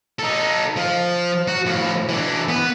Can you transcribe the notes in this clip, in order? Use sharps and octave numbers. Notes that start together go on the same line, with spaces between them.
D#4 A4
F3
F#4
A2 F3
E3 D4
B3